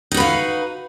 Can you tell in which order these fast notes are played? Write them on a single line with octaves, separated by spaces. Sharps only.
D#4 F#4 B4 F5